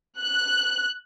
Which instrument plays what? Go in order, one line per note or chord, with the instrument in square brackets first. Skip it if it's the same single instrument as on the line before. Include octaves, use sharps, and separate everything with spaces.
[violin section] F#6